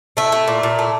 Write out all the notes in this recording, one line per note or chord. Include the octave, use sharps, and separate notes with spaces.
A3 E4
A3
A#2
A#2
A3